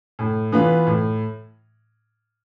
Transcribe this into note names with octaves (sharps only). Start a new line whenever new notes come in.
A2
E3 B3 F4 B4
A2